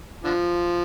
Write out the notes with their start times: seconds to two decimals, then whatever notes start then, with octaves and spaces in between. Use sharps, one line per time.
0.24 D3 F3